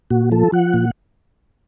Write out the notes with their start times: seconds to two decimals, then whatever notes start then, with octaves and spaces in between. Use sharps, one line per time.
0.10 A#2 F#4
0.32 F3 A4
0.52 F3 F#5
0.74 A#2